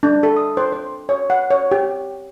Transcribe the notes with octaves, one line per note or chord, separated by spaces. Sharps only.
D4
A4
D#6
C5
C5
C#5
F#5
C#5
G4